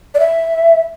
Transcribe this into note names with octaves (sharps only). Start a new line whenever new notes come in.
D5
E5